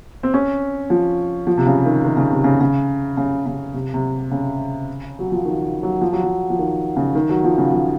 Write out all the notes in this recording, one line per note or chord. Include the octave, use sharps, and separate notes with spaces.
C4
C#4
F3
F3
C3
C#3
D#3
D#3
C#3
C3
C#3
C#3
C#3
C#3
C3
C3
C#3
F#3
F3
D#3
F#3
F3
F#3
F3
F3
D#3
C#3
D#3
F#3
F3
C#3
F3